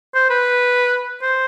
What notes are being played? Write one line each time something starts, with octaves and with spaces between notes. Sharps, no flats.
C5
B4
C5